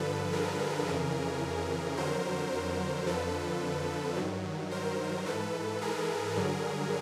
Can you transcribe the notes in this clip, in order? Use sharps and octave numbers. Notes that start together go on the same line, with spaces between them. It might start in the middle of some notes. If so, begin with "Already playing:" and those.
Already playing: G2 D3 F3 A4 B4
G#4 A#4
F2 C#3 E3
F2 D3 F#3 A#4 C5
A#4 C5
F2 D3 F3 A4 B4
G2 D#3 F#3
A#4 C5
G#2 E3 A4 B4
G#4 A#4
G2 D3 F#3